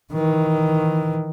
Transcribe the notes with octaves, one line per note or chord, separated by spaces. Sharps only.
D#3 E3